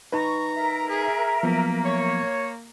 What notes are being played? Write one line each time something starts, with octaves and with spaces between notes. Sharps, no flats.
D#4 B4 A#5 C#6
A#4 E5
G#4
F3 F#3 A#3 B3
C#5